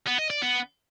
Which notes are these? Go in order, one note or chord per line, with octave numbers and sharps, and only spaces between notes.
B3
D#5
D5
B3